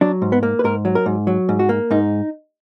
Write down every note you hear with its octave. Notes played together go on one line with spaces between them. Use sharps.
F#3 D4
G#2
B3
A#3
B4
G#2 A#4
F#3
A#4
G#2
F#3
G#2
F#4
A#3
G#2 D#4